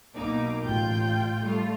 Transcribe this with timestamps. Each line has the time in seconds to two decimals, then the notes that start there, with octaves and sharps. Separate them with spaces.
0.15 B1 B2 A#3 D#4 D6
0.62 A1 F4 G5 G6
1.42 G3 A3 F4